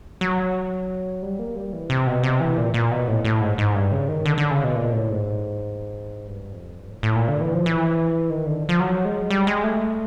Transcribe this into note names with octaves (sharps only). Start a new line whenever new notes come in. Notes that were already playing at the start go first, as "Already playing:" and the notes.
F#3
G3
A#3
G3
E3
C3
B2
C3
E3
A#2
A#2
B2
A2
A2
G#2
G#2
G2
C#3
D#3
D3
D3
C#3
B2
A#2
A2
G#2
G2
F2
G2
A2
A2
A#2
D3
E3
F3
E3
D#3
D3
F3
F#3
G#3
G3
G#3
A3